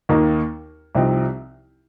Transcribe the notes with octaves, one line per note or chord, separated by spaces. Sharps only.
D#2 D#3 A#3 D#4
C2 C3 F3 C4 D#4